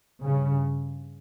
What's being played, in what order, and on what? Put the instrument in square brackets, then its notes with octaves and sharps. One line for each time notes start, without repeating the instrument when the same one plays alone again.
[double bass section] G2 C#3